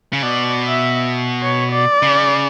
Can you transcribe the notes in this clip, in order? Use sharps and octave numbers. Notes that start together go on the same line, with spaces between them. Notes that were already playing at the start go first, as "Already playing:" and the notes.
C#3
B2 D5
E5
C#5
D5
C#3